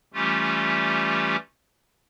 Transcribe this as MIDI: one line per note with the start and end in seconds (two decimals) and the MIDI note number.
0.14 1.36 52
0.14 1.36 55
0.14 1.36 57
0.14 1.36 61
0.14 1.36 65
0.14 1.36 67